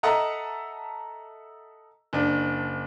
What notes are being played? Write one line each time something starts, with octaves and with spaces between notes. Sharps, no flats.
A4 D#5 E5 F#5 A5 A#5
F#1 D4